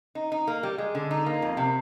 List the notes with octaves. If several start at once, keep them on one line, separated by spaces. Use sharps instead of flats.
D#4
D#4
A#3
G3
G#3
D3
D#4
A#3
F2
C3